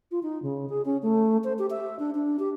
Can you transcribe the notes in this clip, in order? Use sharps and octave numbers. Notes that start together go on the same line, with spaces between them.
F4
D#4
C#3
G#4
C#4
A3
C5
G4
E5
D4
D4
G4